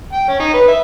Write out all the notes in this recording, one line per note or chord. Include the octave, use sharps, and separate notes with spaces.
G5
C#4
D#4
B4
E5